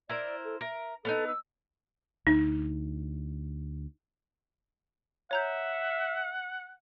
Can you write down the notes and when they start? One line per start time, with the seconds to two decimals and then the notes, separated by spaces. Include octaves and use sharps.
0.09 E4 A#4 C5 D5
0.45 A4
0.61 A#4 E5
1.05 B3 C#4 D#4 A4
1.27 E6
2.27 D2 D#4
5.31 C#5 E5 F#5 A#5 G6